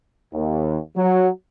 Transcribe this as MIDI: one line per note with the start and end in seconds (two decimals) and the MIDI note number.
0.33 0.79 39
0.97 1.28 54